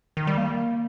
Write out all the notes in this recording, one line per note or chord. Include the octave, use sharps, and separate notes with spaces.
D#3
G3
A#3